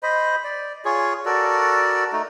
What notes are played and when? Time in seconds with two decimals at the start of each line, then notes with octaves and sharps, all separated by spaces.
0.03 C5 D#5 B5
0.44 D5
0.85 F4 G#4 C#5
1.26 F#4 A4 A#4 D5
2.12 A3 D#4